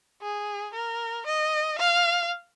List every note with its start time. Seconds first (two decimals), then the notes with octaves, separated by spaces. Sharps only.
0.22 G#4
0.73 A#4
1.26 D#5
1.78 F5